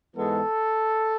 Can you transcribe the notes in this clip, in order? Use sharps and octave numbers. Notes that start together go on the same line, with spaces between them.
G#2 E3 G#3 B3 A4